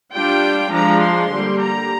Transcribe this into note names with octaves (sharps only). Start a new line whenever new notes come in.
G3 D4 F4 G5
F3 G#3 D4 A#5
C6
D3 G3 A#3
A#5